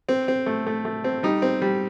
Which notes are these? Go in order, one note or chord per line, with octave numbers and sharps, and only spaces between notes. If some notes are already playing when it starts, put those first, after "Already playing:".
C4
C4
A3
A3
A3
C4
G3 D#4
C4
G3